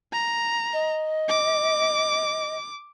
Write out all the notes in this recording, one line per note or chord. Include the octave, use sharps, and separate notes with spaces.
A#5
D#5
D6